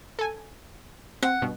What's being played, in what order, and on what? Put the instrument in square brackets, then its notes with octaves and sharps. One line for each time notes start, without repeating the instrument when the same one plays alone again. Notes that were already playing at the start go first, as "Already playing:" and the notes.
[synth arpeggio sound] A4 G#5
[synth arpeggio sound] C4 [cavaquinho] F#5
[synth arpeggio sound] G2 B2